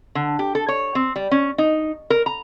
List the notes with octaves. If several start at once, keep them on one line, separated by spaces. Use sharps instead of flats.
D3
G4
A4
C#5
C4
G3
C#4
D#4
A#4
A#5